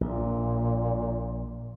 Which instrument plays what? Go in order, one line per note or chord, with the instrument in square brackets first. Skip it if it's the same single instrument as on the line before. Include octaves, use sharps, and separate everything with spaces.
[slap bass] A#1 [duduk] A#2